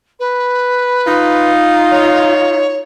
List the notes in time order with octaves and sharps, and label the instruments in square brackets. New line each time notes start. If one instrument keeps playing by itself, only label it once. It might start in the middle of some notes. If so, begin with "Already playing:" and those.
[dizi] B4
[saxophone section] D#4 F4
[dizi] C#5